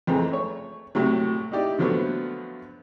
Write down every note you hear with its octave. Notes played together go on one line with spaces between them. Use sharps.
F2 E3 G#3 A3 C4 A#5
A3 C#5
C2 A2 C3 F#3
D#4 E4 G4 D5
D3 F3 F#3 A3 B3